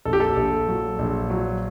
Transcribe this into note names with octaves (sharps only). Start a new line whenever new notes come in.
A#1 A4
G4
A4
A#1
F#3
A#1
F#3